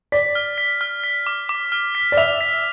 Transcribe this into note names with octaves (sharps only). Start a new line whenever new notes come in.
D5 B6
F6
B6
F6
B6
D6
D6
F6
B6
D5
E5 F7
B6